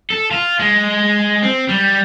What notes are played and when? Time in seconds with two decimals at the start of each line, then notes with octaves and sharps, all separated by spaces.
0.10 A4
0.31 F4
0.59 G#3
1.43 C4
1.69 G3